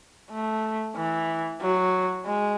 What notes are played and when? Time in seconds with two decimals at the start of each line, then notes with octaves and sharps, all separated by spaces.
0.31 A3
0.96 E3
1.61 F#3
2.26 G#3